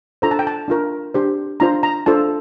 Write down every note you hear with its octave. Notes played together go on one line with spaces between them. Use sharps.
D4 F4 A4 C5 A#5
A5
G5
A5
D4 F4 A#4
D4 G4 C5
D4 F4 C5 A#5
A#5
D4 F4 A4 C5 A5